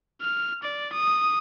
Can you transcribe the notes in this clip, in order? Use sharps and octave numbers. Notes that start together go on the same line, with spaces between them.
F6
D5
D#6